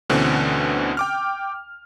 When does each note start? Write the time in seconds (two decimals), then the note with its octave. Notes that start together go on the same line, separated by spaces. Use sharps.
0.09 D2 B2 D3 E3 C4 C#4
0.97 G5 D6 F6